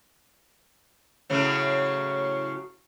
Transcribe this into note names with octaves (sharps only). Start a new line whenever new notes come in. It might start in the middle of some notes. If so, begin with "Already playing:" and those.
A2 C#3 F#3